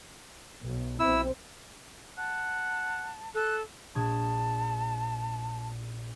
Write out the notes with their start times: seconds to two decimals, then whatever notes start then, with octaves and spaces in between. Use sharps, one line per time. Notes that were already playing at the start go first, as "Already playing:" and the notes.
0.62 B1 B2
1.00 B1 C4 E4 E6
2.18 F#5 A5
3.34 A4 F#6
3.95 A#1 A5 D#6 G#6